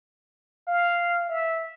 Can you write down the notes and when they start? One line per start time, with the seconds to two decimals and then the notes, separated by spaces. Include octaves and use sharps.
0.67 F5
1.29 E5